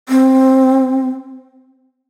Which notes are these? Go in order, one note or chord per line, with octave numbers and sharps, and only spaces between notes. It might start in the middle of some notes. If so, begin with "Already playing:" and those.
C4